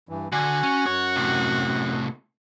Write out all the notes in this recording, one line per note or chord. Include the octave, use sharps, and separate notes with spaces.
G2 E3
D3 F#4 G#5
C#4
F#2 C#5
A2 C3